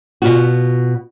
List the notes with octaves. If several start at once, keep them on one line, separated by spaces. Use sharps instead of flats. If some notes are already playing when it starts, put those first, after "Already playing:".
B2 F4 F#4